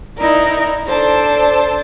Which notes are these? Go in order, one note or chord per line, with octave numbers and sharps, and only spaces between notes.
D#4 E4 A#4 D5
D4 A4 C5 D5 A5